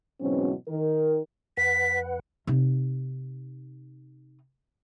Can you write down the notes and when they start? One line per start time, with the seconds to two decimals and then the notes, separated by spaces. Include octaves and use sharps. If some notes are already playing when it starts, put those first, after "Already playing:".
0.20 G#2 B2 E3 F#3 C4 C#4
0.68 D#3 A#4
1.57 F2 B4 F#5 B6
2.47 C3 D#4